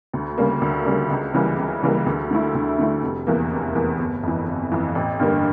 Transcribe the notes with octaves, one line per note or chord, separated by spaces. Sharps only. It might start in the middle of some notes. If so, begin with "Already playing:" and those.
D2
C#3 G3 A#3
D2
C#3 G3 A#3
C#2
C#3 E3 G3 A#3
C#2
C#3 E3 G3 A#3
D2
D3 A3 E4
D2
D3 A3 E4
F1
E2 E3 A#3
F1
E2 E3 A#3
G1
F2 E3
G1
F2 E3
A1
G2 D3 G3 A#3